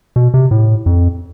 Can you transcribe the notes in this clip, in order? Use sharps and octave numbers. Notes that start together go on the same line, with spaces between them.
B2
C3
A2
F2